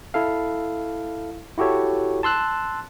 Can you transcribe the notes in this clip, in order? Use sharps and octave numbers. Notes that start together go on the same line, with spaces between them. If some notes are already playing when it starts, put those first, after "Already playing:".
E4 A4 F5
E4 F#4 G4 A4 C#5
A5 C6 E6 F#6